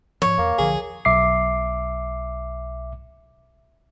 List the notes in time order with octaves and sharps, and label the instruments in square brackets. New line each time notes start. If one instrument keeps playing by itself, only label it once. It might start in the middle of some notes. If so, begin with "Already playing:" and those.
[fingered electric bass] G#2 F3 [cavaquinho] C#5
[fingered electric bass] E2 [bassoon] A#3
[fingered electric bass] B1 D3 F3 [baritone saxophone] G#4
[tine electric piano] B1 E5 D6 C7